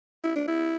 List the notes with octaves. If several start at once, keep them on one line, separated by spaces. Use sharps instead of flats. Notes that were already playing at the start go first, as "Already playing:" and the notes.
E4
D4
E4